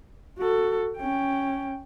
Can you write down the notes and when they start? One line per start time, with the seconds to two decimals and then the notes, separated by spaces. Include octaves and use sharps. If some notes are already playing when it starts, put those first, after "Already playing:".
0.38 F#4 A4
0.97 C#4 G5